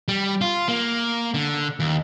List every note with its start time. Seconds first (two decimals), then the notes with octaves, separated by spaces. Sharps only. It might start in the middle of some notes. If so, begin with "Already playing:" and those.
0.08 G3
0.41 F4
0.68 A#3
1.34 D3
1.80 D#2